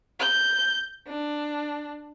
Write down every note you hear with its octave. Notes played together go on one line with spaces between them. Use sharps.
G6
D4